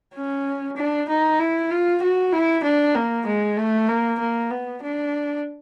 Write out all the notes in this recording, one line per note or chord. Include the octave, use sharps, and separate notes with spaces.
C#4
D4
D#4
E4
F4
F#4
E4
D4
A#3
G#3
A3
A#3
A#3
B3
D4